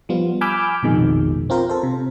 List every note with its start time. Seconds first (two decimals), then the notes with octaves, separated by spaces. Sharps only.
0.09 F3 G3 B3 F4
0.41 G#5 B5 D6 E6 F6 G6
0.83 A#1 F2 B2 D#3 G#3
1.50 C4 F4 A#4 C5
1.69 A4 C5
1.83 C3